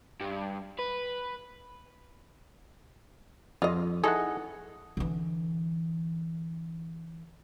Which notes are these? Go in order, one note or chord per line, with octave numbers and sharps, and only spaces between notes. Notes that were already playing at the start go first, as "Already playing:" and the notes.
G2
B4
F2 F4 D#5
D#3 E3 G#4 A4 D#5 F#5
D3 E3